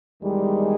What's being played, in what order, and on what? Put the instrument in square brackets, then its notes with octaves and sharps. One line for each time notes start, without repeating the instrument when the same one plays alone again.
[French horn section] E2 D#3 G#3 [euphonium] G3